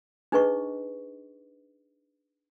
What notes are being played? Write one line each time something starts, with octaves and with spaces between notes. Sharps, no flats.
D4 D#4 G#4 B4 D#5 C#6